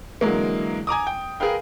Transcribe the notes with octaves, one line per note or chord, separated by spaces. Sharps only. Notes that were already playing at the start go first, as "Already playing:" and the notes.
D3 E3 F#3 G#3 A#3
G#5 A#5 D6 D#6
G5
G#4 A#4 B4 F5 G5